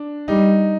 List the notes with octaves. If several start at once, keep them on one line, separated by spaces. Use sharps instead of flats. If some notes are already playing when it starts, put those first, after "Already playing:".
Already playing: D4
G3 D#4